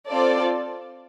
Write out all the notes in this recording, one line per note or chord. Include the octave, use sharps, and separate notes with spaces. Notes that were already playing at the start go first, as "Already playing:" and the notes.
C4 F4 A4 D5